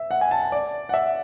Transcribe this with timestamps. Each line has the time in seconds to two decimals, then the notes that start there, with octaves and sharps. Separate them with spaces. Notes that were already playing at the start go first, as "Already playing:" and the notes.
Already playing: E5
0.11 F#5
0.21 G#5
0.31 A5
0.42 A5
0.52 D5
0.89 F#5
0.94 E5